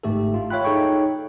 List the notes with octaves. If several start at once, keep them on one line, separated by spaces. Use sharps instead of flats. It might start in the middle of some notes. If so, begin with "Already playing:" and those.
G1 G#2 A3 G4 A4
F4
C#5 E5 F5 G5 B5 F#6
D#4 G#4 A4 C#5 G5 C#6